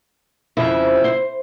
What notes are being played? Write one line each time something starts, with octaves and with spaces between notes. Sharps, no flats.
F2 C#3 F3 E4
C5